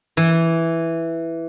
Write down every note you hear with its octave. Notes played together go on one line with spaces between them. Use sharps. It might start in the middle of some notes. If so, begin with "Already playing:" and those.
E3